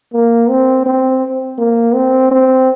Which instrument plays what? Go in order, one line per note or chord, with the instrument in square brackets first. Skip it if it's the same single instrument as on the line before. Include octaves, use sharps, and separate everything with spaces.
[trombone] A#3
C4
C4
A#3
C4
C4